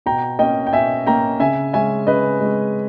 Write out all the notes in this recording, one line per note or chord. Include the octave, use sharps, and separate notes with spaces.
B2 G5 A#5
A#3 C#4 D#5 G5
G5
B2 E5 G#5
A#3 C#4 G5 A#5
C#3 E5 G#5
G#3 C#4 E5 G#5
C#3 B4 D#5
G#3 C#4